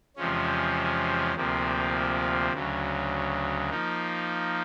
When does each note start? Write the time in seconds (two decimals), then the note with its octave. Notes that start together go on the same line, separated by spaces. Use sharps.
0.17 E2 C3 F3 G#3 C#4
1.35 D2 C3 F3 A#3
2.53 D2 C#3 F#3
3.70 F3 A#3 D#4